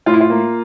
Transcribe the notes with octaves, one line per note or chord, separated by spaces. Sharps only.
A2 F4
E4
F4
A#3